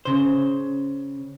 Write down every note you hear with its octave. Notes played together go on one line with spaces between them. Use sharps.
C#3 C5